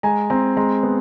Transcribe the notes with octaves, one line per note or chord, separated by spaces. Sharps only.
G#3 G#5 A#5
C4 A#5 C6
G#3 A#5 C6
B3